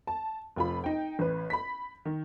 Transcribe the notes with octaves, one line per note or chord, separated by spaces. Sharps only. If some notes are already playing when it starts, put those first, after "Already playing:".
A5
F1 F4 B5
D#4 G5
A1 B4
B5 B6
D#3